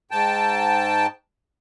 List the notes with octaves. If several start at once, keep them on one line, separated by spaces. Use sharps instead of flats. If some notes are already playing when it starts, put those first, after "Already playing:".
G#2 G5 A5